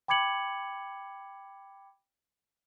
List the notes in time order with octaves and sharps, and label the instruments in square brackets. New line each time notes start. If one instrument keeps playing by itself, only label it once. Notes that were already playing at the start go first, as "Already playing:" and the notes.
[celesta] G5 B5 D6 G#6 C#7 F#7